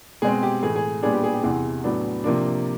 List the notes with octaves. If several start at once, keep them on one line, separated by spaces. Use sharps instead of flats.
B2 G#3 C4 G#4
G4
A2 E3 A3 G#4
G#4
A#2 G3 B3 D4 G#4
G4
G#4
G4
E2 C3 E3 G#4
A2 F#3 B3 D4
C3 F3 A#3 D4